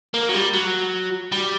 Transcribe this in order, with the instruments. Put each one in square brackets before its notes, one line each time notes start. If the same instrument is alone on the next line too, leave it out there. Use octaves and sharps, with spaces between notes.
[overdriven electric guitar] A#3
F#3
G3
F#3
G3